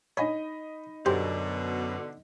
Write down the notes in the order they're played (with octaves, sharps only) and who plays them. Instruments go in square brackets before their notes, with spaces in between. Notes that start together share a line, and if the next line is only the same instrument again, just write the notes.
[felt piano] D#4 D#5 B5 [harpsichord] C#5 G#5
[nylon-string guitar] F#2 [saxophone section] B2 D3 [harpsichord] G4 C5